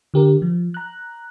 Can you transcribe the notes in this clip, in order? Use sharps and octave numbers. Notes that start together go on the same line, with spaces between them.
D3 G4 A#4
F3
A#5 F#6